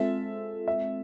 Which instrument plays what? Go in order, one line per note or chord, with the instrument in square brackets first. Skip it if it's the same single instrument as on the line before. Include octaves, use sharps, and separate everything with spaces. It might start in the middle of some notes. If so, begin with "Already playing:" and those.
Already playing: [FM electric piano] G#3 C4 F4 A4 [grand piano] E5
[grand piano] E5